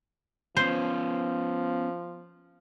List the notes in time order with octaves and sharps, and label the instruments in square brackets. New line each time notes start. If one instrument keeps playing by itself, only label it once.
[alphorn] F3 [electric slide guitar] B3 C#4 [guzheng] C5